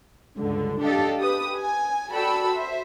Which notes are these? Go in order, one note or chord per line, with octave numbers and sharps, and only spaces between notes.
C#2 G2 D3
D4 G4 A4 D#5 F5
G4 B4 D#6
G#5
F#4 A4 D5 G5 B5 E6
C5 E5